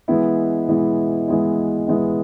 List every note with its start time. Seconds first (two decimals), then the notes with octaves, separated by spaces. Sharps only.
0.08 E3 G#3 B3 E4
0.69 E3 G#3 B3 E4
1.28 E3 G#3 B3 E4
1.88 E3 G#3 B3 E4